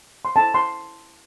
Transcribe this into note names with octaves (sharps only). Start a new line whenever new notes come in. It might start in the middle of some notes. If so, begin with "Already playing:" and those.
C6
C#4 E4 C5 A5
C6